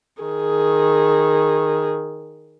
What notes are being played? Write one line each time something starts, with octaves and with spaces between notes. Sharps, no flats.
D#3 G#4